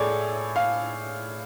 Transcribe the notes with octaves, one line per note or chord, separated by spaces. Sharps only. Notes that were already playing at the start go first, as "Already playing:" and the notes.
Already playing: A2 G#4 A4 C#5 D5
F5